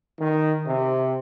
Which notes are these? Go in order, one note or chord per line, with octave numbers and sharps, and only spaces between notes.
D#3
C3